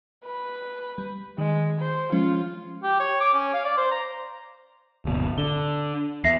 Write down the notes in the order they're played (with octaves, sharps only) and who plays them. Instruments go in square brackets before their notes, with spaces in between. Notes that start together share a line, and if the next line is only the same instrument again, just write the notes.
[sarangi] B4
[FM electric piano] G3
[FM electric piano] D#3 [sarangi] G#3
[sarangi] C5
[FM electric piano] F3 G#3 C#4 [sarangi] F4
[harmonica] G4
C#5
D6
C#4
F5
D5
C5
A#5
[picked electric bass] D1 G1 B2
[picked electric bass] D3 [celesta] G7
[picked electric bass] E2 [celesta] E5 A#6 C7